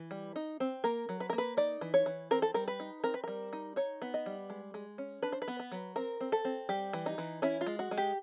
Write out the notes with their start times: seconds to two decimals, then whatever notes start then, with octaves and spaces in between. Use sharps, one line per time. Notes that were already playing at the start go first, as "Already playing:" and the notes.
Already playing: E3
0.11 G3
0.36 D#4
0.60 C4
0.84 A#3 A#4
1.09 F#3
1.20 B4
1.30 A#4
1.33 A#3
1.38 B4
1.57 D#4 D5
1.81 E3
1.94 C#5
2.06 E3
2.31 C4 A#4
2.42 A4
2.54 G3 A#4
2.68 B4
2.80 D#4
3.04 C4 A#4
3.14 B4
3.24 G3 A#4
3.53 D#4
3.76 D#4 C#5
4.02 B3
4.14 D#5
4.26 G3
4.50 G#3
4.74 G#3
4.98 C#4
5.23 D4 B4
5.32 C5
5.42 B4
5.48 B3
5.60 B4
5.72 F#3
5.96 C4 A#4
6.21 C4
6.32 A4
6.45 C4
6.69 G3 G4
6.93 E3
7.06 D#4
7.18 E3
7.42 C#4 E4
7.61 F4
7.67 G#3
7.79 F#4
7.91 G#3
7.98 G4